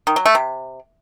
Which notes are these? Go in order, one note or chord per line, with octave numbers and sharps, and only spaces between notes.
D#3
F#3
A3
C3